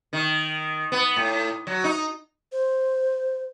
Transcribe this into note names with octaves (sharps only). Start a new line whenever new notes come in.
D#3
B3
A2
F#3
D#4
C5